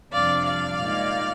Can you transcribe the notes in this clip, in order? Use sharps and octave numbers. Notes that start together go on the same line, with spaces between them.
F2 C3 G3 D4 D5 F5
D5 F5
A#2 G#3 D#4